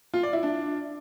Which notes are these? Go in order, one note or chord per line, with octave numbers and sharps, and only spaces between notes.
F4
D5
E4
D4